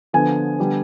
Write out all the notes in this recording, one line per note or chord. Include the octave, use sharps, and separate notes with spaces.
D3 F3 B3 G#5
D3 G3 B3